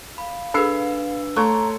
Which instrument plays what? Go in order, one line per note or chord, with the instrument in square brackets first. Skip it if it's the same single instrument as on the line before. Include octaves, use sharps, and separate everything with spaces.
[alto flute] F5 [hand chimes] B5
[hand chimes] D4 B4 [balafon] G#4 A4 [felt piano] B5 E6 C7
[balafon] A3 C#6 [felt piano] A4 [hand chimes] C#5 C6 G#6 [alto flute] A#5